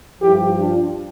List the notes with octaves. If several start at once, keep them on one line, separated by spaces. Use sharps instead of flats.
G2 F3 E4 G4
D4 F4